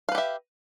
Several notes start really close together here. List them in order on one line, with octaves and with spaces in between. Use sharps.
F5 B4 G4 E5